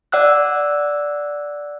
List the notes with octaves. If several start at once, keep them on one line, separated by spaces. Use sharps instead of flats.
D5 F#5 E6 F#6